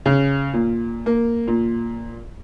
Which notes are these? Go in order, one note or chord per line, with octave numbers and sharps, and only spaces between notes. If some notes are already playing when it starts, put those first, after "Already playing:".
C#3
A#2
A#3
A#2